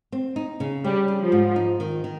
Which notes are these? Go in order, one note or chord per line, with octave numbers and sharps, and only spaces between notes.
C4
D#4
C#3
G3 C#4
G#4
F3
G#2
D#4
D#3
D#3